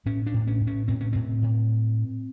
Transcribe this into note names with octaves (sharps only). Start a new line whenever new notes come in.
A2 C#4
D4
A2
C#4
A2
C#4
A2 C4
C#4
A2 C4
A2